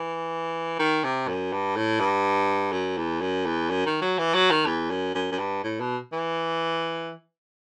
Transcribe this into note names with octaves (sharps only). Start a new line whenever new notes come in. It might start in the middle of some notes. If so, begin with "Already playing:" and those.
Already playing: E3
D#3
C3
F#2
G2
A2
G2
F#2
E2
F#2
E2
F#2
D#3
F#3
E3
F#3
D#3
E2
F#2
F#2
F#2
G2
A2
B2
E3